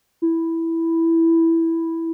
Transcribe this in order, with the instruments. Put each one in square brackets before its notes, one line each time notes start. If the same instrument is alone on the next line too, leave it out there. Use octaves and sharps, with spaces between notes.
[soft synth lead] E4